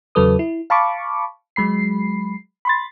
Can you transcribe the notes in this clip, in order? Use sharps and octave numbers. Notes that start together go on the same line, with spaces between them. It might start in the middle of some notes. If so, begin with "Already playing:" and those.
E2 C#3 F#3 A4 B4 D#6
E4
F5 A5 B5 C#6 D6
F#3 G#3 B5 C7
B5 C6 A6